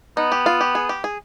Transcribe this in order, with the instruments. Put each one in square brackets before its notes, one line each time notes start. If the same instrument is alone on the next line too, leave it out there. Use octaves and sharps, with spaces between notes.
[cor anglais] B3 [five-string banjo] D#4
[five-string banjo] G4
F4
G4
G#4
G4
G#4